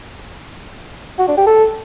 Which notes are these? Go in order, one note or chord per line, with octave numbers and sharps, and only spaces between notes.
F#4
D4
G4
A4